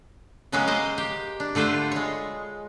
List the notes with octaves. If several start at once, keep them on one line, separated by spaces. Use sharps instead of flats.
C#3 F#3 G#3 A#3 B3 C#4
C5 D#5 F5
G4
D4
D3 A3 F4 B4 C5
G#3 C#5